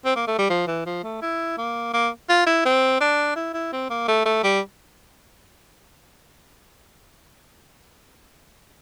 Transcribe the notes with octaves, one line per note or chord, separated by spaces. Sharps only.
C4
A#3
A3
G3
F3
E3
F3
A3
E4
A#3
A#3
F4
E4
C4
D4
E4
E4
C4
A#3
A3
A3
G3